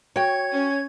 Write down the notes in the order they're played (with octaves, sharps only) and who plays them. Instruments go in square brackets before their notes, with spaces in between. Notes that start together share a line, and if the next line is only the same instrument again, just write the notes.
[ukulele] F#4 G5 [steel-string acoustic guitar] C#5 [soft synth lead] G#6
[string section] C#4